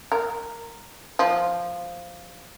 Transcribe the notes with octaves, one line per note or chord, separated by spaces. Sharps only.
A#4
F3